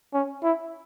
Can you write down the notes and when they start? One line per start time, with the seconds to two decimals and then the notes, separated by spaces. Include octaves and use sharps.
0.14 C#4
0.43 E4